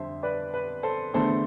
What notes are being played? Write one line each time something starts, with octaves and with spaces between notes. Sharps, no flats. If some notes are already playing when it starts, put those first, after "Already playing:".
Already playing: F2 D3 G3 C5 E5
B4 D5
B4
A4 C5
E2 D3 A3 A4 C5